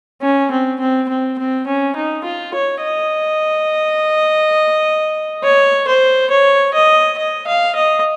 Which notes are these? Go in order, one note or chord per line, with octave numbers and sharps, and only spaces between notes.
C#4
C4
C4
C4
C4
C#4
D#4
F4
C#5
D#5
C#5
C5
C#5
D#5
D#5
F5
D#5